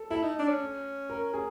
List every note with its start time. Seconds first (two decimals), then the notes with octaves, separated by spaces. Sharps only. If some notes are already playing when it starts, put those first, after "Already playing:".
Already playing: A4
0.10 E4 A4
0.23 D#4
0.39 D4
0.48 C#4
1.10 A#4
1.33 G#4